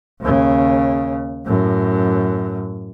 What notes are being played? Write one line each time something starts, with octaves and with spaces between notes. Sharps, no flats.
D#2 C#3
F#2 A2